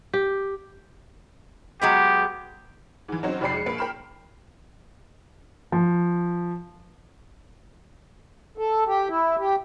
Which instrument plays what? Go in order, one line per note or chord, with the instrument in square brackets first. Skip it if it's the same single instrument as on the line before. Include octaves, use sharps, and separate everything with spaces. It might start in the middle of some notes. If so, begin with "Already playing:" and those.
[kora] G4
[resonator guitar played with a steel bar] F#3 G#3 B3 [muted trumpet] G4
[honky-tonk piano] G#2 E3
F#3 C4 C#4 D#4 F#4 C5
F1 F2 G4 D5 B5 C7
G#3 C#7
A#1 A#3 B4
A#4 G5 B5 F6 E7
[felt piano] F3
[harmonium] A4
G4
E4
G4